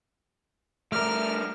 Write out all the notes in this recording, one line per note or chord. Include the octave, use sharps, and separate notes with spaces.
G2 A3 A#4 D5 F6